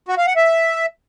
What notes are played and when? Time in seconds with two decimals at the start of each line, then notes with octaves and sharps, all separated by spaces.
0.09 F#4
0.18 F5
0.27 F#5
0.36 E5